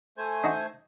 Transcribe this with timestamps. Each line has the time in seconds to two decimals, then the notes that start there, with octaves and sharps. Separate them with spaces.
0.18 A3 C5 G#5
0.44 D4 D#4 F#4